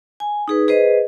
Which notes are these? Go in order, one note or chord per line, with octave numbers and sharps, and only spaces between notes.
G#5
D#4 G#4 B4
G#4 B4 C5 D#5